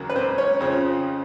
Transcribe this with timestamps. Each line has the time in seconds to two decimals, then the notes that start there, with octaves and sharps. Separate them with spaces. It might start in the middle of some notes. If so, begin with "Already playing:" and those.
Already playing: D#2 C#3 F#3 A#3
0.10 B4
0.16 C4 C5
0.38 C#4 C#5
0.61 F2 C#3 F3